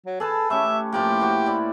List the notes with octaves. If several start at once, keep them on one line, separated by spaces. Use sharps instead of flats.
F#3
G#4 A4 B4 A5
A3 C#4 G4 E5
A2 F3 A#3 G4
F#4 C5 G5
E4 D5